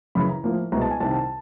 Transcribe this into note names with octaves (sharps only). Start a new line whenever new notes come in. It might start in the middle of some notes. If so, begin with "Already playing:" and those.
F#2 C#3 E3 B5
A#5
A2 F3 A#3
C2 B2 G#3 A#5
A5
G#5
C2 C3 D#3 A5
A5